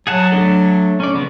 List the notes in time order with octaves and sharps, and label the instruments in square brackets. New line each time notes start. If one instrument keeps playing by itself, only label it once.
[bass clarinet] F#3 [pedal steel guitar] G#4 F#5 A5
[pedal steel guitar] A3 D4 A4
C#4 D5
C#3 F3 B3